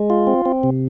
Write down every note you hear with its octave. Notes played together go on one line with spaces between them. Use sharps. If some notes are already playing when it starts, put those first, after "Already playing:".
Already playing: G#3
F4
C4
C4
C3